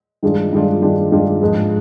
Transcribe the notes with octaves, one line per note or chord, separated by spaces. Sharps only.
G2 D#3 G#3 D4 F4
G2 D#3 G#3 D4 F4
G2 D#3 G#3 D4 F4
G2 D#3 G#3 D4 F4
G#2 F3 G#3